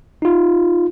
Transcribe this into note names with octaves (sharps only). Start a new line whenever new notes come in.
D#4 F4